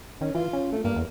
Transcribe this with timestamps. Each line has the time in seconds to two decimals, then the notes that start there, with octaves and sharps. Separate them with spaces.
0.21 D#3 C#4
0.35 E3 F4
0.53 C#4
0.72 A3
0.84 G2 A#3
0.96 E2